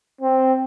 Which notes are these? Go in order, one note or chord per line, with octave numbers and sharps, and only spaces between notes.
C4